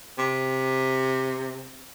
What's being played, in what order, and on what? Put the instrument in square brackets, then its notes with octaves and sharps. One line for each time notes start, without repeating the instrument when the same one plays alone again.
[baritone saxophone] C3